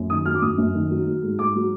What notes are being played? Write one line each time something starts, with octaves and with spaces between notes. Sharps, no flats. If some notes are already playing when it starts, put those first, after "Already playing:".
Already playing: F#2
D#3 D#6
F#3 F6
D6
F#2 D#6
F#2
D#3
F#3
F#3
G#2
G#2 D6
F#3